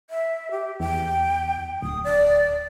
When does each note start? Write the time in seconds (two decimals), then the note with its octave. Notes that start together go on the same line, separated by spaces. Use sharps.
0.10 E5
0.51 G4
0.80 E2 G5
1.82 D1 D#6
2.04 D5